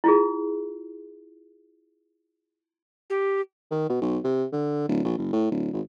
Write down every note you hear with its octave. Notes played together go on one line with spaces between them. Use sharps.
E4 F4 G#4
G4
D#3
B2
B1
C3
D3
D1
A#1
F#1
A2
D1
G#1